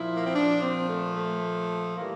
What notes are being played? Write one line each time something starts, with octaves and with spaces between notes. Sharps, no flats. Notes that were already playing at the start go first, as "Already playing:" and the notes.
Already playing: A#2 F3 E4
A#3
C4
A#2 F3 D4
C4
A3
A3
E3 G3 A#3